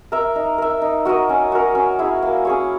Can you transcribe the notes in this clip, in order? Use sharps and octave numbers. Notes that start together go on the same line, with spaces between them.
A#4 E5
D#4
A#4 E5
D#4
F#4 A#4 D#5
C#4
F#4 A#4
C#4
E4 G#4
A#3
C#4 G#4 C#5